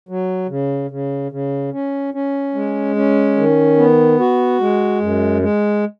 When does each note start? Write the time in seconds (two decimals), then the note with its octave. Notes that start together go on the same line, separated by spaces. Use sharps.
0.09 F#3
0.49 C#3
0.91 C#3
1.32 C#3
1.73 C#4
2.14 C#4
2.55 G#3
2.96 C#4
3.37 D#3
3.78 B3
4.19 F#4
4.60 G#3
5.02 F#2
5.42 G#3